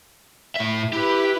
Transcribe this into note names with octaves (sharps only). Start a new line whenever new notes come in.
A2 E5
E4 G4 B4